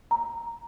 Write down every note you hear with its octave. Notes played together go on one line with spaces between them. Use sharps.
A#5